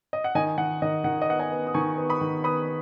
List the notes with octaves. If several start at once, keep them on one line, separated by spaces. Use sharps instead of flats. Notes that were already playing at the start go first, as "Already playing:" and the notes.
D#5
F#5
D#3 D#5 G#5
D#3 F#5
D#3 D#5
D#3 F#5
D#5
B3 F#5
D#5 G#5
B3
D#6
D#3 G#5 C#6
B3
B5 D#6
D#3
B3 B5 D#6